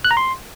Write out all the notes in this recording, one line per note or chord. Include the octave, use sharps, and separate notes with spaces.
F#6
A#5
C6